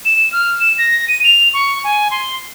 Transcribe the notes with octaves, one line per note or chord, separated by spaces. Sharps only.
E7
F6
E7
A#6
D#7
F7
C#6
G#5
C6